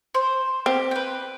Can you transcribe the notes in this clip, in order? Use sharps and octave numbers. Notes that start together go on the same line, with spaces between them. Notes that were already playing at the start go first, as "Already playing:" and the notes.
C5
C4 G4
B4 G5